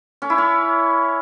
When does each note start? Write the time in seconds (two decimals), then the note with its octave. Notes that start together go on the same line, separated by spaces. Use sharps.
0.22 C#4
0.30 E4
0.38 C#4